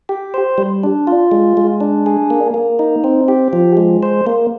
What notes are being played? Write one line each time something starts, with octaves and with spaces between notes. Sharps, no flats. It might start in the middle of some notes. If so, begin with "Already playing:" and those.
G4
C5
G3
D4
F4
G#3
G#3
D4
G#4
A#3
A#3
D#4
C4
G4
F3
G#3
C5
A#3